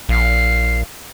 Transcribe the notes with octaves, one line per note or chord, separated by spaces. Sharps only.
A#1 F5